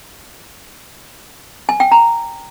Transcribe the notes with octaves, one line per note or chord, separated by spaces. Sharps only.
G#5
G5
A#5